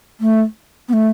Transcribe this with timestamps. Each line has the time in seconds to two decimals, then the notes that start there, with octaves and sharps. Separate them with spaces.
0.21 A3
0.89 B3
0.93 A3